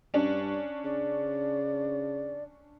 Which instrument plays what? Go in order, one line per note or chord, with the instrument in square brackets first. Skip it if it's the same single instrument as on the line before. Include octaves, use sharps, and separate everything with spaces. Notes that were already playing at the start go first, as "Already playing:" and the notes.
[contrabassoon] G2 [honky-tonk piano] C#4 D4
[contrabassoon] C#3 [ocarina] D5